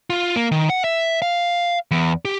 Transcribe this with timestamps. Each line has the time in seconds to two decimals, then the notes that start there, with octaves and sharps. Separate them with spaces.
0.10 F4
0.36 A#3
0.52 D#3
0.70 F#5
0.84 E5
1.22 F5
1.91 E2
2.25 G4